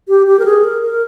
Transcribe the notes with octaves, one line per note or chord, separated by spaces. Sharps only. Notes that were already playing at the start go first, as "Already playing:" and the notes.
G4
G4
A#4
G#4
A#4
A#4